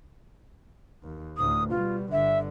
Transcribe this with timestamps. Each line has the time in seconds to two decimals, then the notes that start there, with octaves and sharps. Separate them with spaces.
1.04 D#2
1.37 D2 A2 D#6
1.70 B2 G3 F4
2.12 G1 D3 E5